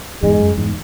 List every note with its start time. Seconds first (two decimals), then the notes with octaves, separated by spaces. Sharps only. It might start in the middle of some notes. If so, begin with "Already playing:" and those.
0.22 E2 G#2 G#3
0.40 F#2
0.57 E2 G#2